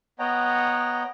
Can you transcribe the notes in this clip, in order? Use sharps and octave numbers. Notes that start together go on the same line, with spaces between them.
B3 C#5 D#5 F#5 G5 A#5